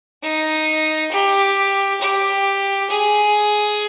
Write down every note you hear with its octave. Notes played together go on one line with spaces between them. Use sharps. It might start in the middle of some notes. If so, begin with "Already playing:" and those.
D#4
G4
G4
G#4